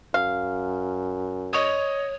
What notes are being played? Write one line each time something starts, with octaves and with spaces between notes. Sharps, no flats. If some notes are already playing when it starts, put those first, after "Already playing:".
F#2 F5
C#5 D#5 C#6 D#6